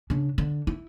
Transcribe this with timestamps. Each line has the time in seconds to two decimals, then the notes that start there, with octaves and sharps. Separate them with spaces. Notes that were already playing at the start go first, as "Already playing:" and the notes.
0.10 C#3 D4
0.38 D3
0.67 E4